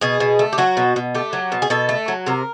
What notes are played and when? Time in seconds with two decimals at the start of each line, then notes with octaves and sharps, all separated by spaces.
0.01 B2 G#4
0.20 B2
0.39 A3
0.53 G4
0.58 F#3 F#4
0.77 B2
0.96 B2
1.15 A3 G4
1.33 F#3
1.52 B2
1.62 G#4
1.70 B2 A4
1.89 A3
2.08 F#3
2.26 C3 A#4